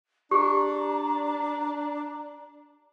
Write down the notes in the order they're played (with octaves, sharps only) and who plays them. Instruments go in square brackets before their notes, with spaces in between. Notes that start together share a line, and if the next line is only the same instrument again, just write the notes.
[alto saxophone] D4 [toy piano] G4 G#4 [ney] A#5